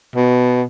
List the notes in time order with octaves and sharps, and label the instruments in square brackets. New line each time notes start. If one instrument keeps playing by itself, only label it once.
[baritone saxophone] B2